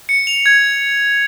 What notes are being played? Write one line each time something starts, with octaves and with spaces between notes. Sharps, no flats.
C#7
F7
G#6